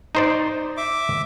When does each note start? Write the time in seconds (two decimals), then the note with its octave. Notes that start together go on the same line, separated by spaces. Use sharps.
0.15 D#4 C5 D5
0.77 E5 D6